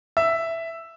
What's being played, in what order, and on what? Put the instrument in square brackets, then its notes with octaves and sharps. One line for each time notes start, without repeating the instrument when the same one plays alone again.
[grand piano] E5